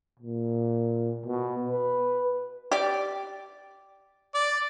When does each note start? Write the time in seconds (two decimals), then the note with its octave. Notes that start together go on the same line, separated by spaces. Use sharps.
0.19 A#2
1.26 B2
1.69 B4
2.72 G4 D5
4.34 D5